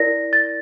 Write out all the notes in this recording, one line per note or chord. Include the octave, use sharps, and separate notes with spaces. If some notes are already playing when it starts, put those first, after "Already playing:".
Already playing: E4 A#4 D5 A#6
A6